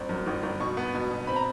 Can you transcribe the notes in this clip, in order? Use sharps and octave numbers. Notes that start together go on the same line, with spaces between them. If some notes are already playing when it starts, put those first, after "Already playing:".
Already playing: G1 C4
F#2
G1
G1
B2 C#6
B3
B2
B2
C4 B5
A#5